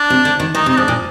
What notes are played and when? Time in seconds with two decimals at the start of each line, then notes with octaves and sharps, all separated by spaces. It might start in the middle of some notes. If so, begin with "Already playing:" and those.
Already playing: D4
0.10 C3
0.25 D3
0.40 D#3
0.55 D#3 D#4
0.66 C3 D#4
0.77 G#2 D4
0.88 A#2